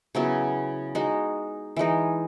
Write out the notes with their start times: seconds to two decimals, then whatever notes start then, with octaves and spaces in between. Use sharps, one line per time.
0.15 C#3 F#3 B3 E4
0.95 G#3 D#4 F#4
1.76 E3 G#3 D#4